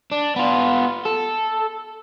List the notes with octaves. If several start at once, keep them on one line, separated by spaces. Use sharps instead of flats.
D4
B3 F4
A4